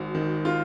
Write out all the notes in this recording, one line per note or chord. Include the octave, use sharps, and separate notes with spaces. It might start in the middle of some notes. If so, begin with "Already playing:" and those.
Already playing: G#1 G#2 F#4
D#3
F4